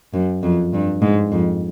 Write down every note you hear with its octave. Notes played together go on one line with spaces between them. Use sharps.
F#2
F2
G2
G#2
F2